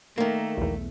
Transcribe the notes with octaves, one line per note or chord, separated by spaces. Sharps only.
D#3 A3 A#3
B1 E2